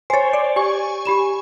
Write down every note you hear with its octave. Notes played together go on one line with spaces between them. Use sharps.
C5 C#5 G#5 A6
D5
G4 G#5 C#6
G4 B5 E7